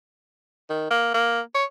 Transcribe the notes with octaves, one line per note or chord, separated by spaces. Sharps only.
D#3
A#3
A#3
C#5